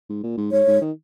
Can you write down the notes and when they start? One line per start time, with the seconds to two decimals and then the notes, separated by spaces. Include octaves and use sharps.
0.09 G#2
0.23 A#2
0.38 G#2
0.52 G#2 C#5
0.67 G#2
0.81 D#3